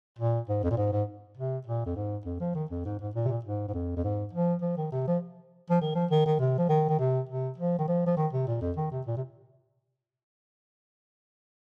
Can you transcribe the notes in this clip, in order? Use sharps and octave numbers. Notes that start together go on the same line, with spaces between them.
A#2
G#2
F2
A#2
G#2
G#2
C3
A#2
F2
G#2
F2
F3
D#3
F2
G#2
G#2
A#2
C3
A#2
G#2
G#2
F2
F2
G#2
F3
F3
D#3
C3
F3
F3
D#3
F3
D#3
D#3
C3
F3
D#3
D#3
C3
C3
F3
D#3
F3
F3
D#3
C3
A#2
F2
D#3
C3
A#2
C3